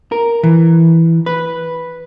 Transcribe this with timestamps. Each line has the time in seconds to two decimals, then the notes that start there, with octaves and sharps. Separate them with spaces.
0.12 A#4
0.43 E3
1.26 B4